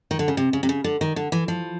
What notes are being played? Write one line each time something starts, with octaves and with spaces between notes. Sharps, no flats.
D#3
D3
C#3
C3
C#3
C3
C#3
D3
D#3
D3
E3
F3